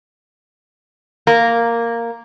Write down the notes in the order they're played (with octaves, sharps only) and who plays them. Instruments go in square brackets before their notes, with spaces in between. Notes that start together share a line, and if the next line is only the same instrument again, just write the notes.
[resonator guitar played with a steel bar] A#3